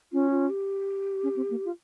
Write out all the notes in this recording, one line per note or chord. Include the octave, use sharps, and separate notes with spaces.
C#4 F4
F4
G4
C#4
C4
A#3
F4